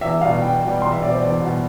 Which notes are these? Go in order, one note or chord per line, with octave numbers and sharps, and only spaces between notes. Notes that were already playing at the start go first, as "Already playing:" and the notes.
E2 E5
B2 G3 F5
E2 G5
B2 G3
E2 C6
E5
B2 G3 D5
C5
E2 D5
B2 G3